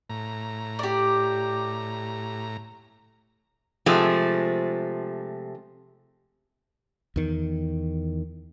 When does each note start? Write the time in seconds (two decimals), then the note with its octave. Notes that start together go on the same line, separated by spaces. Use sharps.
0.10 A2 A#5
0.79 G4 D5
3.86 C3 F3 G#3 A3
7.16 E2 D#3